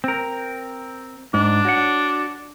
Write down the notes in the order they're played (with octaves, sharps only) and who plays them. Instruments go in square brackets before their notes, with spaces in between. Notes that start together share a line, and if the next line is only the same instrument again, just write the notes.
[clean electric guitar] C4 A#4
[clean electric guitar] G#2 [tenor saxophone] D4
[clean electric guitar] F#4 C#5 F#5